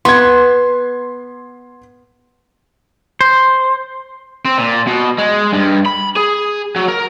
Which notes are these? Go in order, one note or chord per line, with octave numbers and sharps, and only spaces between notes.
B3 C6 G#6
C5
C4
A#2
B2
G#3
G2
B5
G#4
F#3
A#4